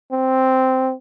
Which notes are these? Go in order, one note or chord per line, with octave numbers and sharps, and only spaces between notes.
C4